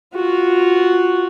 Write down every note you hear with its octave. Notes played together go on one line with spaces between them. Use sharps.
F4 F#4